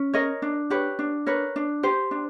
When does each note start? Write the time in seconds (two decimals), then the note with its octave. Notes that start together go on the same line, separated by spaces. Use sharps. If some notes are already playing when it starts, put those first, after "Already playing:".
Already playing: C#4
0.13 A#4 C#5 D#5
0.42 D4
0.70 G4 B4 C#5
0.99 D4
1.26 A#4 B4 C#5
1.56 D4
1.83 G4 C5
2.11 D4